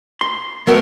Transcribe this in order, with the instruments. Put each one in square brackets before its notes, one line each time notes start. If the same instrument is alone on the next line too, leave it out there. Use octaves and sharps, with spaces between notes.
[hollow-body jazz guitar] C6
[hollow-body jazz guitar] F#3 A3 B3 [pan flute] A#4